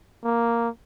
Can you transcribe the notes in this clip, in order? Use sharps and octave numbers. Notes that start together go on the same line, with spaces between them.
A#3